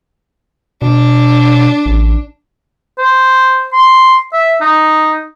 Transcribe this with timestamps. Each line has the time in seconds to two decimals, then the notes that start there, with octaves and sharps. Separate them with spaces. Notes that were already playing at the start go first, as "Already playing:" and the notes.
0.82 B2 D4
1.86 A1
2.98 C5
3.73 C6
4.33 E5
4.61 D#4